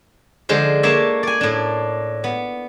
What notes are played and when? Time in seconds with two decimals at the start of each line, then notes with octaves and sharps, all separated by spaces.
0.49 D3 F3 G#3 C5
0.83 A#3 D4 C#5 E5
1.23 D5 G#5
1.41 A2 D4
2.24 B3